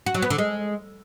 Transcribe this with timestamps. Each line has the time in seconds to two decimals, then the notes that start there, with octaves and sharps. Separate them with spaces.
0.06 F#4
0.14 F#3
0.22 B3
0.30 D3
0.38 G#3